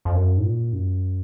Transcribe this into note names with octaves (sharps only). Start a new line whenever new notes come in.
F2
F#2
G#2
A#2
F#2